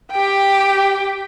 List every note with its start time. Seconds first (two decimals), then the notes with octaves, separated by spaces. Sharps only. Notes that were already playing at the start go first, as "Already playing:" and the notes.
0.12 G4 G5